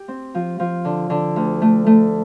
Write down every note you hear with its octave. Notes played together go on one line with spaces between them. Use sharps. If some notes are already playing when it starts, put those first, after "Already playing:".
Already playing: G4
C4
F3
F3
D3
D3
D2
A3
A3